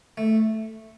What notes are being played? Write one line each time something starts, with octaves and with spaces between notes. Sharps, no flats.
A3